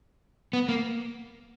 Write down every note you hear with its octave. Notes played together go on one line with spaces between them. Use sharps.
B3
A#3